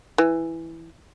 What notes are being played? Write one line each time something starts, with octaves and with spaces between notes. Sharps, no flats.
E3